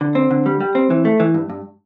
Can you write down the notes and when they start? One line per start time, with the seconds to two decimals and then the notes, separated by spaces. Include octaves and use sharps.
0.01 D3
0.15 C4
0.31 D3
0.46 G3
0.60 G3
0.75 C4
0.90 E3
1.05 A3
1.20 E3
1.34 G2
1.50 G2